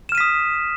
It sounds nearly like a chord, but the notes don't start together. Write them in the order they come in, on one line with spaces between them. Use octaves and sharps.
E7 F6 D#7 B6 D#6